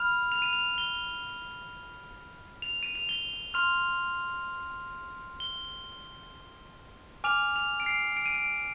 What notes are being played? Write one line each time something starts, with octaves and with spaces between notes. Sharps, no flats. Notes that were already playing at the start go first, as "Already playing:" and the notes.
Already playing: B5 F6 F7
F7
D#7
F7
G7
F7
D#7
F7
G7
C6 F6 F7
G7
G#5 D6 F6 F7
F7
D7
C7
D7
D#7
D7